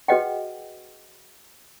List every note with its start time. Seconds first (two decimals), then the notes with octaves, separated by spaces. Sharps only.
0.08 F#4 G#4 B4 D#5 F#5 G5